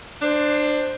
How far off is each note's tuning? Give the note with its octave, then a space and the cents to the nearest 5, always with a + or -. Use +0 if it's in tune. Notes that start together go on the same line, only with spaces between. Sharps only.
D4 +20 C5 +5